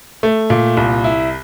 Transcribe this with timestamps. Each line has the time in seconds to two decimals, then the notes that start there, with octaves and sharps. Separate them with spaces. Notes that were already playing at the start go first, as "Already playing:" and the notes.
0.23 A3
0.50 A#2
0.77 C2
1.04 E4